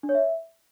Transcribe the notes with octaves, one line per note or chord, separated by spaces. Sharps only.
D4
C#5
E5